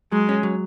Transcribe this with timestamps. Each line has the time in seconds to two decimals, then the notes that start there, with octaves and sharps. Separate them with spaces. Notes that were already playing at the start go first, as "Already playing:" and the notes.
0.12 F#3 G#3
0.29 C#4
0.43 F#3